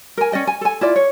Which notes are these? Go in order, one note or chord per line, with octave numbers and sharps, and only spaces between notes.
A#4 G#5
C#4 D5 D#5 G5
G#5
A4 G#5
E4 F4 D5
C#5